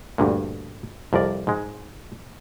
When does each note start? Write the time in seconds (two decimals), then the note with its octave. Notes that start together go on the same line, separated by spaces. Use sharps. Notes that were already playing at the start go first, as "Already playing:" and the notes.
0.18 D2 G2 A#2
1.13 C2 F2 A#4 D5
1.47 G#2 G#3